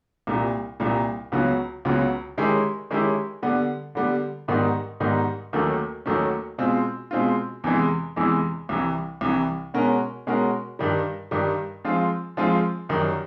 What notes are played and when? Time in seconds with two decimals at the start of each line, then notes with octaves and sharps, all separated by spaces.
0.27 C2 A#2 G3
0.80 C2 A#2 G3
1.32 C#2 C#3 F#3 B3
1.85 C#2 C#3 F#3 B3
2.38 D#3 G#3 C#4 E4 G4
2.90 D#3 G#3 C#4 E4 G4
3.43 D3 G3 B3
3.95 D3 G3 B3
4.48 G#2 D#3 G3 B3 D#4
5.00 G#2 D#3 G3 B3 D#4
5.53 D#2 D#3 F#3 A3 C#4
6.06 D#2 D#3 F#3 A3 C#4
6.58 B2 G#3 C4 F4
7.11 B2 G#3 C4 F4
7.64 E2 C3 E3 G#3
8.16 E2 C3 E3 G#3
8.69 C2 C3 E3
9.21 C2 C3 E3
9.74 B2 G#3 C#4 F#4 A#4
10.27 B2 G#3 C#4 F#4 A#4
10.79 G2 D#3 G3
11.31 G2 D#3 G3
11.84 F3 G#3 C4 F4
12.37 F3 G#3 C4 F4
12.89 F#2 D#3 G3